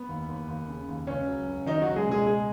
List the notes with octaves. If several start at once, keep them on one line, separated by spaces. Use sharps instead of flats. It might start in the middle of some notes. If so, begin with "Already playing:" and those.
Already playing: B3
D#2
D#2
D#2
C#3
D#2
C#2 C#4
F#3
C#2
D#3 F#3 D#4
C#2 F#3 F#4
G#3 G#4
B2 G#3 G#4
G#3 G#4